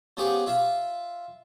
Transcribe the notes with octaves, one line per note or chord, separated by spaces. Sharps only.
F3 B3 C#4 G4 G#4 G#5
F4 E5 F5